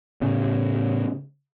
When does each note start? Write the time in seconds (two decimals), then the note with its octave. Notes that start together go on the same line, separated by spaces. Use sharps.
0.21 A2 C#3